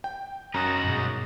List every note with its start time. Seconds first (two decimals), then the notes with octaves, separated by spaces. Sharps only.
0.04 G5
0.54 F#2 D#4 F#4 A#5 D#6 A6
0.85 G2 B2 G#3